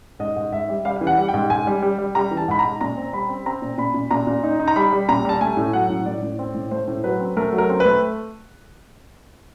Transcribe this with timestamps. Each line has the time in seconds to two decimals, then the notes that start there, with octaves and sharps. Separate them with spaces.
0.20 G#2 D#5
0.36 G#2
0.52 G#2 E5
0.69 G3
0.85 G3 F5
0.96 E3 F5
1.07 F#5
1.18 G3
1.28 G5
1.34 G#2
1.50 G#2 G#5
1.67 G3
1.82 G3
1.98 G3
2.15 G3 A#5
2.31 E3
2.37 A5
2.48 G#2 B5
2.59 G#2 A#5
2.81 A#2 A#5
2.97 C4
3.13 G3 B5
3.29 C4
3.46 C4 A#5
3.62 A#2
3.78 A#2 B5
3.94 A#2
4.11 A#2 A#5
4.27 A#2
4.43 D#4
4.60 D#4
4.68 A#5
4.76 G3 B5
4.93 G3
5.09 A#2 A#5
5.25 G3 A5
5.41 A3 G#5
5.57 A2
5.73 F#3 F#5
5.90 A2
6.06 A2 D5
6.23 A2
6.39 C4
6.55 A2
6.71 A3 C5
6.88 A2
7.04 F#3 B4
7.20 C4
7.37 A3 A#4
7.53 F#3
7.58 A#4
7.69 C4
7.80 B4
7.85 A3